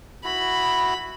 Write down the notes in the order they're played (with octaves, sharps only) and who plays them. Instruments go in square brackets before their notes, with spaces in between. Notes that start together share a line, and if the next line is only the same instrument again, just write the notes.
[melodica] E4 F#4 [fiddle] B5